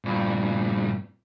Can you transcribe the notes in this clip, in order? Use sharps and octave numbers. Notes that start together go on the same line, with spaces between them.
G2 A#2